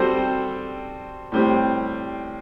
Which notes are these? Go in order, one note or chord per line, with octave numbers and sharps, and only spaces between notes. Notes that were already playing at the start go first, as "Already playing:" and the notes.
Already playing: G3 C4 F#4 A4 C5
A2 G3 C4